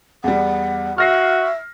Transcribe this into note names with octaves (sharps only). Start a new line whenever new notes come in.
E2 G3 F#5
F#4 E5 F6 A#6 C7